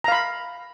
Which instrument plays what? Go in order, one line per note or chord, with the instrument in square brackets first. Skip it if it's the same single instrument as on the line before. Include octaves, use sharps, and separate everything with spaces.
[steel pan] A#5
F5
B5